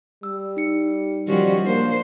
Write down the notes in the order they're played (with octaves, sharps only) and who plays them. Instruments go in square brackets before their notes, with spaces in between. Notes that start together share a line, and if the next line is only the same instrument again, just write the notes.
[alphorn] G3 [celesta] E6
[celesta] D#4 C#7
[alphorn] D#3 [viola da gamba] F3 C#4 F#4 [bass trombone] G3
[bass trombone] A#3 [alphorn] D4 [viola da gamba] C5